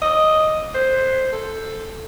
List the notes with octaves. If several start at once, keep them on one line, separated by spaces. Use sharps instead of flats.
D#5
C5
A4